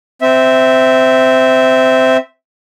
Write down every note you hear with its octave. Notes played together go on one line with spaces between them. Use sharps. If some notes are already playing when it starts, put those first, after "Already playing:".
C4 E5